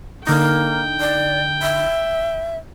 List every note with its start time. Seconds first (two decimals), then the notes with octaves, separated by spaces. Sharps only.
0.27 D3 A#3 D#4 G5
1.00 D5
1.62 E5